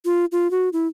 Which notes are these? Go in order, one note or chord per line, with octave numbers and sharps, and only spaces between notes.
F4
F4
F#4
E4